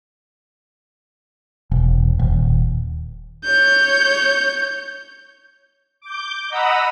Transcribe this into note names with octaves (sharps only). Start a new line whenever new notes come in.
E1
D#1
C#5 G6
D6 G6
D#5 F#5 A#5 B5 D#6 E6